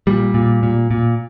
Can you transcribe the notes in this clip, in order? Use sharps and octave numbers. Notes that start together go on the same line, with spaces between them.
A#2 G3
A#2
A#2
A#2